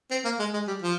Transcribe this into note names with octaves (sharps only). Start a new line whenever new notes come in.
C4
A#3
G#3
G#3
G3
F3